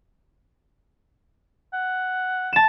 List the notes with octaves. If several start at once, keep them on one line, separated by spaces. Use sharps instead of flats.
F#5
A5 E7